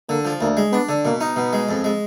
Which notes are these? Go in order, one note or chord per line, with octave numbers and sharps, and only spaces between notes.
D3 A#3
F3
D2 A#3
G#3
B3 D4
D3
B2 A#3
D#4
B2 B3
G#3
F2
G#3